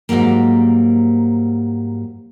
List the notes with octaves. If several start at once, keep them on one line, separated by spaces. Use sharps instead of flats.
G#2 E3 F#3 G3 A#3